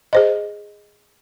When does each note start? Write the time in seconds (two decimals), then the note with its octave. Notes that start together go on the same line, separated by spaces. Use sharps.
0.13 G#4 C5 D#5